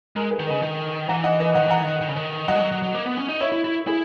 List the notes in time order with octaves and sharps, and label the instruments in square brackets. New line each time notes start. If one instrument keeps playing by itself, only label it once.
[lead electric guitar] G#3 [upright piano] A#4
[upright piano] G#4 B4
[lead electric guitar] D#3
[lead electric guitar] C#3 [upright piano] B4 D#5
[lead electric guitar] D#3
[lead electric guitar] E3 [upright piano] F#5 A#5
[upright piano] D#5 F#5
B4 D#5
[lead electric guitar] D#3 [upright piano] D#5 F#5
[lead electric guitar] E3 [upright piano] F#5 A#5
[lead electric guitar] D#3
D#3
C#3
D#3
[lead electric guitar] F#3 [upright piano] D#5 F#5
[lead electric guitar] G#3
F#3
F#3
F#3
A#3
B3
C#4
D#4
[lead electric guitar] E4 [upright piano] C#5 E5
[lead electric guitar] E4
E4
[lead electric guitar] E4 [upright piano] G#4